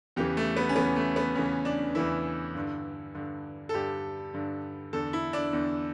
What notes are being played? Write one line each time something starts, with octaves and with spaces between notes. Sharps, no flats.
E2 C#3 E3 G4
A3
B3
C#4
E2 C#3 E3 B3
A3
B3
E2 C#3 E3 C#4
D4
E2 C#3 E3 E4
G2 D3
G2 D3
A4
G2 D3 G4
G2 D3
E2 D3 A4
E4
D4
E2 D3